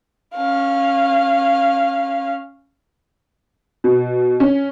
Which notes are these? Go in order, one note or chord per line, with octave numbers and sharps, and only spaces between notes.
C#4 F5
B2
C#4